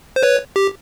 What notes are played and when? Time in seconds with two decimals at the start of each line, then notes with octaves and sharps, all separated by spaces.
0.16 C5
0.23 B4 C#5
0.56 G4